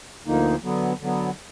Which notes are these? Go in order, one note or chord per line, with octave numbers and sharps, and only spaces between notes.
D2 D3 F3 A#3 D#4
D3 F#3 B3
D3 F#3 B3